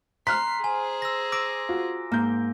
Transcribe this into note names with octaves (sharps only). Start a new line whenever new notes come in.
A#5 C6 F6 F#6 B6 C7
G#4 C5 G#5
E6 A#6
D6 E6 A#6 D7
F4 F#4
G#2 A#3 G6